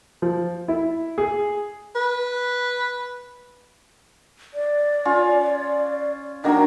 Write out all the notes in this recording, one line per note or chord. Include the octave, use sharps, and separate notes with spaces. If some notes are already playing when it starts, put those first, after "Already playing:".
F3
E4
G#4
B4
D5
C#4 F4
D#3 F#3 A#3 D4